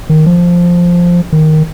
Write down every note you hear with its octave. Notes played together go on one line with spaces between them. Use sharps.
D#3
F3
D#3